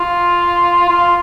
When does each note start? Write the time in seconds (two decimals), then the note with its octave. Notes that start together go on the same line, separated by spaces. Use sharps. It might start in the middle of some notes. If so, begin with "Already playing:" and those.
Already playing: F4
0.89 F4